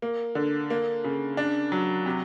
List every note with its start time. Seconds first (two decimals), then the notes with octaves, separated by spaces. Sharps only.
0.02 A#3
0.35 D3
0.70 A#3
1.04 C#3
1.37 D4
1.72 F#3
2.06 C3